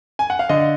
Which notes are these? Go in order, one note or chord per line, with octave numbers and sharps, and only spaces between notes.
G#5
F#5
F5
D3 D#5